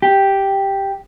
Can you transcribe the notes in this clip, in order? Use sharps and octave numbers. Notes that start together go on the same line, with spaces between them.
G4